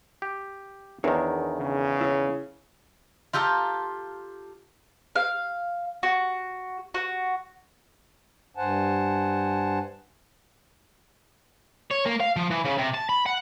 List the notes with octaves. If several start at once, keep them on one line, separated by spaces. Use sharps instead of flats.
G4
E2 D#3 D4 A#4 C#5
C#3
E4 C#5
F4 G4 A4 G5 A#5
F5
F#4
F#4
G2 C5 F#5 G#5 A5
C#5
A#3
F5
F3
E3
C#3
C3
A5
B5
F#5